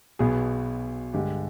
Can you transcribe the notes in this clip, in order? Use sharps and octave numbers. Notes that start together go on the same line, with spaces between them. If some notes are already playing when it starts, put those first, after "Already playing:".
B1 B2 B3 G#4
G2 D3 G#3 G4